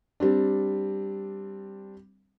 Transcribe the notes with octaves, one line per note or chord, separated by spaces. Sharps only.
G3 C4 D4